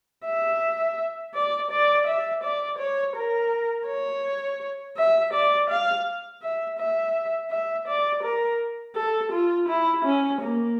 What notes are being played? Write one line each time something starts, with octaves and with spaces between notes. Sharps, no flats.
E5
D5
D5
E5
D5
C#5
A#4
C#5
E5
D5
F5
E5
E5
E5
D5
A#4
A4
F4
E4
C#4
A#3